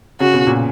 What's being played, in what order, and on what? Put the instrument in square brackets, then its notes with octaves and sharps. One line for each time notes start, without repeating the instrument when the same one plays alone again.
[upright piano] C#3 [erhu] F#4
[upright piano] B2
A#2